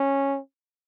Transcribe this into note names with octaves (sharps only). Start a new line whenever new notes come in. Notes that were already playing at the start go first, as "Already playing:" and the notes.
Already playing: C#4